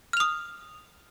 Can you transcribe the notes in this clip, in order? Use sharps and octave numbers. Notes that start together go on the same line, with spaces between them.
D#6 F6 F7